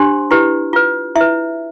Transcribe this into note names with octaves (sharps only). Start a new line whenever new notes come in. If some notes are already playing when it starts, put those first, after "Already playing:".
Already playing: D4 G4 C5 C6
E4 G4 B4
F4 B4
E4 E5
B4